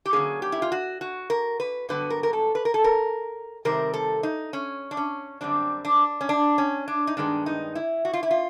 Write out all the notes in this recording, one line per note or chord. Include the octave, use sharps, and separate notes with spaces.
G4
D3 F#3 A#3 C#4 G#4
G4
E4
F4
F#4
F#4
A#4
B4
G2 D3 F#3 B3 B4
A#4
A#4
A4
B4
A#4
A4
A#4
C3 D#3 G3 C4 A#4
A4
D#4
C#4
D4
C#4
F#2 D3 G3 C4 D4
D4
C#4
D4
C#4
D4
D#4
G2 D#3 G#3 B3 D4
D#4
E4
F#4
F4
E4
F4